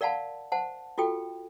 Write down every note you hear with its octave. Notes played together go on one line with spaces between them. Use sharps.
A#4 D5 F5 F#5 A5 B5
C5 F#5 A5
F4 F#4 A4 G5